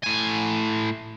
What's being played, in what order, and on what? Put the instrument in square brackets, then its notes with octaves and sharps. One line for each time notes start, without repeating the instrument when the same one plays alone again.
[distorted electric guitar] A2 G#5